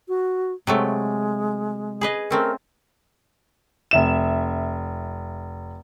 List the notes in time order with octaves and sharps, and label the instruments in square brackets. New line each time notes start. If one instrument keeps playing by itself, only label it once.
[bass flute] F#4
[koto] C3 F#3 A3 [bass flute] G#3
[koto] G#4 B4 D#5
[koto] A3 C4 C#4 [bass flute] A#4
[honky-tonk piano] F1 E5 E7